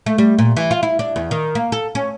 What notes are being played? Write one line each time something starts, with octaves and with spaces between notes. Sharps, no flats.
A3
G3
A#2
E3
F4
E4
D4
E2
D#3
A#3
A4
C#4